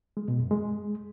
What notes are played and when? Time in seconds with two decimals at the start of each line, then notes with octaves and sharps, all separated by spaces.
0.17 G#3
0.28 B2
0.39 F#2
0.51 G#3